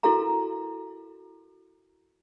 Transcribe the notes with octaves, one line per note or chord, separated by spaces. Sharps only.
E4 F#4 A4 A#4 F5 A#5